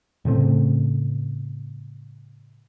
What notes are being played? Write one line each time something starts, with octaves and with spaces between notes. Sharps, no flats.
A2 C#3 A3 C4